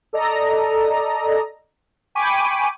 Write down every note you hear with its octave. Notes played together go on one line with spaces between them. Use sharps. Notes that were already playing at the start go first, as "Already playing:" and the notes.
A4 D5 D#5 A#5
G5 G#5 B5 C#6 D6 D#7